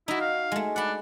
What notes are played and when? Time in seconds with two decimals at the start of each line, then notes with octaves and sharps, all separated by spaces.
0.08 D#4 E4 F#4
0.21 F5
0.52 G#3 A3
0.76 D4 F#5 B5